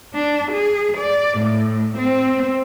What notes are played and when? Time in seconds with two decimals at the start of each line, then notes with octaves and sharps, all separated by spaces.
0.14 D4
0.52 G#4
0.98 D5
1.38 A2
1.98 C4